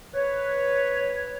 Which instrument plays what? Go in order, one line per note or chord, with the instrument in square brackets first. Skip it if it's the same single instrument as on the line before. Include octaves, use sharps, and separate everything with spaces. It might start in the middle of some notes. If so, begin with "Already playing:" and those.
[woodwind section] B4 C#5